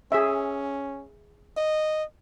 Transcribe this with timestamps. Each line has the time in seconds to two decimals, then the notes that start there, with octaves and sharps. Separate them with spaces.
0.12 C#4 G#4 E5
1.57 D#5